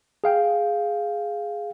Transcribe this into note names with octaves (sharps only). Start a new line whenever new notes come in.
G#4 F5 G5